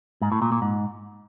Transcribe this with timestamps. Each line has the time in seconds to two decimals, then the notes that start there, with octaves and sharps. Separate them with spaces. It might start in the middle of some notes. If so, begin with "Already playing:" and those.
0.22 G#2
0.32 A2
0.42 A#2
0.52 A#2
0.62 G#2